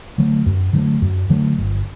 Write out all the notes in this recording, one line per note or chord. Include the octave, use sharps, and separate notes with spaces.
D3 F#3 A3
F#2
D3 F#3 A3
F#2
D3 F#3 A3
G1